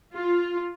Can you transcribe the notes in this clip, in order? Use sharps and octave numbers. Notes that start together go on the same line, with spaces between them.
F4